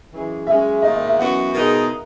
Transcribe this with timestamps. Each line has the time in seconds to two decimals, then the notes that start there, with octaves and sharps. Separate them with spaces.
0.11 F#2 C#3 E3 G#3
0.47 F#2 C#3 G#3 C#4 E5
0.82 G#2 D#3 A#3 D#5
0.95 D#5
1.07 E5
1.19 F#2 E3 B3 F#4 F#5
1.54 B2 G#3 D#4 G#4 A#4